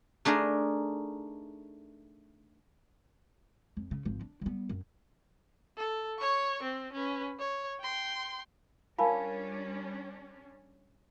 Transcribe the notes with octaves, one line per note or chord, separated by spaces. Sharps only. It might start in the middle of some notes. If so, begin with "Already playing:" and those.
A3 D4 D#4 G#4 A#4
F2
C#3
G#1 F3
D4
G3 B3
F#2
A4
C#5 C#6
C4
C#4 B4
C#5
G5 C6
G3 C#4 D4 F4 A#4 F5 G#5 A5